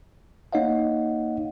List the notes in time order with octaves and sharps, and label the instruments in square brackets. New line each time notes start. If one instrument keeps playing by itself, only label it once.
[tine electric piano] A#3 D#4 C#5 D#5 F5 F#5